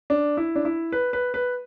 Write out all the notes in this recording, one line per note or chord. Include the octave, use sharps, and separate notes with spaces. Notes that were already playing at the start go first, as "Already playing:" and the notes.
D4
E4
D4
E4
B4
B4
B4